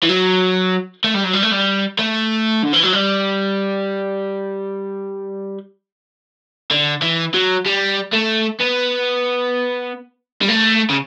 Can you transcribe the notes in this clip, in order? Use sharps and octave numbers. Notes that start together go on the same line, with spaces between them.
E3
F#3
A3
G3
F#3
G3
A3
G3
A3
D3
E3
F#3
G3
D3
E3
F#3
G3
A3
B3
G3
A3
C#3